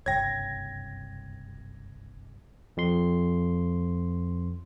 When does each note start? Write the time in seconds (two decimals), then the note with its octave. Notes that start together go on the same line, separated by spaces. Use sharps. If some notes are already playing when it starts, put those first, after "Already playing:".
0.06 F#1 C2 G2 C#5 G5 G#6 A#6
2.77 F2 C6